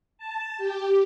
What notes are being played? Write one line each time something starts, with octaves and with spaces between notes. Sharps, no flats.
A5
G4